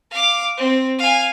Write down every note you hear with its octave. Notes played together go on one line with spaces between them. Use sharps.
F5 D6
C4
F5 G#5